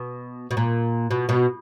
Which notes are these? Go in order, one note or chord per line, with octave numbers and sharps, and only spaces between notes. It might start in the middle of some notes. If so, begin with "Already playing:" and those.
Already playing: B2
B2
A#2
B2
B2